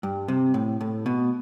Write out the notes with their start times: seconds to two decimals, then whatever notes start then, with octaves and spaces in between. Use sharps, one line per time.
0.03 G2
0.28 C3
0.54 A2
0.81 A2
1.06 B2